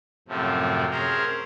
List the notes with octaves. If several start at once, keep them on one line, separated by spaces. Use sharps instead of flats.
F#2 A2 C3 F3
C#4 G#4 A#4 C5